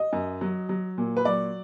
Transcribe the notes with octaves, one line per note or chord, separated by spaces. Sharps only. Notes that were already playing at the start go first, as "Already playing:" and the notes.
Already playing: D#5
F#2
F#3
F#3
A#2
B4
F#3 D5